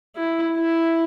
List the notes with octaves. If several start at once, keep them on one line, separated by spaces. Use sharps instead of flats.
E4
E4